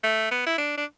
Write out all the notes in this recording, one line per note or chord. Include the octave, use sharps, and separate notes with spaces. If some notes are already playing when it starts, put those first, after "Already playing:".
A3
B3
E4
D4
D4